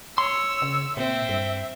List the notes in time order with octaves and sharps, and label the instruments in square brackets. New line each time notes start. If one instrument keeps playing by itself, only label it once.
[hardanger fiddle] C#5 [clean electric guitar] C6 [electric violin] E6
[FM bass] C#3
[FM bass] A#2 [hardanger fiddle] C4 [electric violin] E5
[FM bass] G2